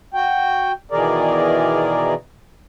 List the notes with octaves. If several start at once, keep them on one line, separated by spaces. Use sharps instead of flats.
F#4 G5
B2 D#3 E3 G#4 A#4 D5